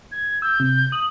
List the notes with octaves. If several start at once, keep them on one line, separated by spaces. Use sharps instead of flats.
G#6
E6 G6
C3
D#6 F#7